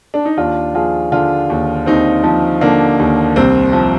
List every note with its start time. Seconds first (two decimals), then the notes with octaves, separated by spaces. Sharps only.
0.14 D4
0.25 D#4
0.37 D#2 D4 F4
0.74 F3 F4 G#4
1.12 D3 D4 F4
1.50 D#2
1.86 D#2 C4 D#4
2.24 F3
2.61 D3 A#3 D4
2.99 D#2
3.36 C2 C4
3.73 F3